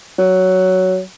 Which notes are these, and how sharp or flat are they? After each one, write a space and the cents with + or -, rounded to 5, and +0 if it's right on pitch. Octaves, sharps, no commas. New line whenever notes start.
F#3 +10